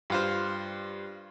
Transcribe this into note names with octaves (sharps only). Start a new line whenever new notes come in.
G2 F4 C5